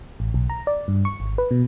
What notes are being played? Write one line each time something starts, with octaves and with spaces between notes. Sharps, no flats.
A1
B1
A#5
D5
G2
C#6
G#1
B4
B2